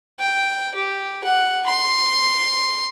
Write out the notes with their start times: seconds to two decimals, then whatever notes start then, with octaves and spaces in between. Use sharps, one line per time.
0.19 G5
0.74 G4
1.24 F#5
1.66 C6